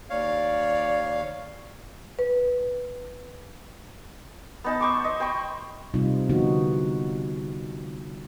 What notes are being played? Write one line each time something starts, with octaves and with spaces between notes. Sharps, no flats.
D#2 C#5 D5 F5
B4
B3 D#4 A5
C5 C#6 D6
D#5
C5 G5 B5 C#6
C3 G3 C4 D#4 F4
D3 F3 B3 D#4 F#4